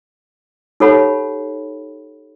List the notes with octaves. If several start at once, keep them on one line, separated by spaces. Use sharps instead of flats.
D#4 G4 A4 C#5 F#5 B5